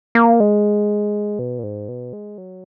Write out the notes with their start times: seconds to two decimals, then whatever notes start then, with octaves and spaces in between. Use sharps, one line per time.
0.15 A#3
0.40 G#3
1.39 B2
1.59 A#2
1.63 G#2
1.89 B2
2.13 G#3
2.38 F#3